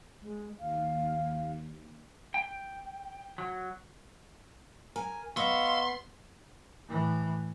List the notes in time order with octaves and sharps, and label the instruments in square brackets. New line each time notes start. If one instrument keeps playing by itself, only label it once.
[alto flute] G#3
[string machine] D#2 [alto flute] F5
[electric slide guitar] G5
F#3
[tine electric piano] A#4 [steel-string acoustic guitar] G#5
[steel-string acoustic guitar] B3 [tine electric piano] D#5 C#6 [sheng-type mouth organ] F5 E6 [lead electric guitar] C6
[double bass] A2 E3